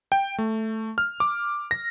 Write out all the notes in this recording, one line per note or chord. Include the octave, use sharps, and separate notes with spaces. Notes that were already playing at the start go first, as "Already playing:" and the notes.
G5
A3
F6
D6
A#6